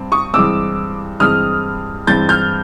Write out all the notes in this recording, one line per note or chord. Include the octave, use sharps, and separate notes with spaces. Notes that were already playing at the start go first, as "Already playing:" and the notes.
Already playing: G2 C4
C#6 D#6
G2 E3 G#3 C4 D6 E6
G2 E3 G#3 C4 D#6 F6
G2 E3 G#3 C4 G6 A6
F6 G6